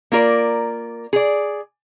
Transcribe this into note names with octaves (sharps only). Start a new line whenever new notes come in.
A#3 F4 A#4 D5
G#4 D5